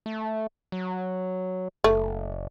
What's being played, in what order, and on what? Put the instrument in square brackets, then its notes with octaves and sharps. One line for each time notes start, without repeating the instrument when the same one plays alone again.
[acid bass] A3
F#3
[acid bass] F#1 [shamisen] A3